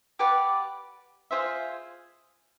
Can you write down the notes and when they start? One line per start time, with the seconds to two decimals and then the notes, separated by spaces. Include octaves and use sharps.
0.19 G4 B4 D5 F#5
1.31 F4 G#4 C5 E5